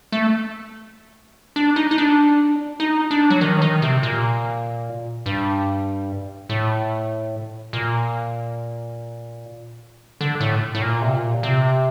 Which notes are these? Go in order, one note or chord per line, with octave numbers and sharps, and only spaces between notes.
A3
D4
D#4
D#4
D4
D#4
D4
F#3
D#3
F#3
D#3
C3
A#2
G2
A2
A#2
D3
A2
A2
A#2
C3
A#2
C3